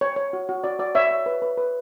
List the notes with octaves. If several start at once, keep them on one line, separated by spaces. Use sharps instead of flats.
C#5
C#5
F#4
F#4
F#4 D5
F#4 D5
C#5 E5
C#5
B4
B4
B4